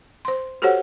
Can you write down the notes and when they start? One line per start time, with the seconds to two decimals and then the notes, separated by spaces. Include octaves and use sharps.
0.25 C5 C6
0.62 F#4 G4 A4 C5 C#5 F#5